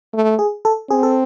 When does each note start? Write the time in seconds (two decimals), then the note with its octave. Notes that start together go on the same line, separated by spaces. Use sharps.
0.14 A3
0.39 G#4
0.65 A4
0.90 C4 G#4
1.03 A4